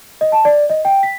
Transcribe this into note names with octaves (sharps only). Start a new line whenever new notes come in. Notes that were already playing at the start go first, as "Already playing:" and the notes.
D#5
A5
D5
D#5
G5
B6